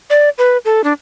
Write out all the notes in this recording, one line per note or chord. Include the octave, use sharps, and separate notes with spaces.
D5
B4
A4
D4